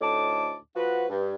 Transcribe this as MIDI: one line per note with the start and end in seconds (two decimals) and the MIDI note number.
0.01 0.56 38
0.01 0.56 45
0.01 0.56 63
0.01 0.56 81
0.01 0.56 86
0.76 1.05 53
0.76 1.05 66
0.76 1.05 71
1.09 1.35 43